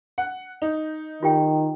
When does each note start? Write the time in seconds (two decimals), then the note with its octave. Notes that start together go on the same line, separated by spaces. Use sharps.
0.18 F#5
0.62 D#4
1.23 D#3 F4 G4 G5